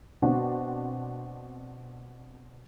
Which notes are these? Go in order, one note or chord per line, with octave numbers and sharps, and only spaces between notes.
B2 C4 D4 F#4